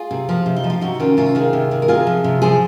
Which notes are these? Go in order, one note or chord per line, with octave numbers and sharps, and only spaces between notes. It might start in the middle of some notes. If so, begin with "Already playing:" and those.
Already playing: F4 G#4
C3
F3
C3
D#4
F3
F4
C3 D#4 F#4
D#3 C#4 F4
C3 C#4 F4
D#3 F4 G#4
C3
D#3
A#4
C3 F4 G#4
F3
C3
F3 G#4 C5